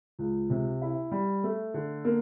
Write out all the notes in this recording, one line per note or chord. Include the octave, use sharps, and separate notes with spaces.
C#2
C3
E4
G3
A3
D3
A#3